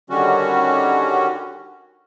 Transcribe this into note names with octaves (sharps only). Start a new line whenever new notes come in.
D3 D#3 G3 C#4 F#4